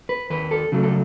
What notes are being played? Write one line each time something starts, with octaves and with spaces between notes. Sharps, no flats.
B4
D#2 B4
A4
C#3 F#3 A3
A4